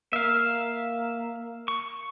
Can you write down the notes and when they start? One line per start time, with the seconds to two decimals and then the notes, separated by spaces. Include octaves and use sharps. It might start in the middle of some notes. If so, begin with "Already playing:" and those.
0.13 A#3 E5 F5
1.68 C#6